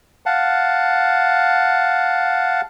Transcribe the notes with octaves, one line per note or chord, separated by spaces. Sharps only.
F5 F#5 A5